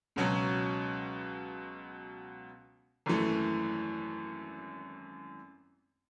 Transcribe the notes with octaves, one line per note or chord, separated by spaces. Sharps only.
C#2 B2 F#3 C#4
G#1 F#2 E3 A3